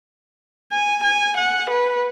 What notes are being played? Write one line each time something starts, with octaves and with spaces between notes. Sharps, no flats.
G#5
G#5
F#5
B4